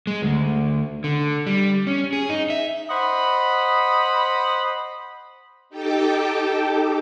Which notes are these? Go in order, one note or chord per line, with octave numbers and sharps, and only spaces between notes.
G#3
D2
D3
G3
C#4
G#4
D#4
E5
C5 D#5 F#5 B5
D#4 G4 A4 G5 A5 D6